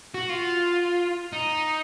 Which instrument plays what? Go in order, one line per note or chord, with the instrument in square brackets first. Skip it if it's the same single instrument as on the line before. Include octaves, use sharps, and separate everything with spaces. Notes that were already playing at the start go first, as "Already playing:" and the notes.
[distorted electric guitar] F#4
F4
D#4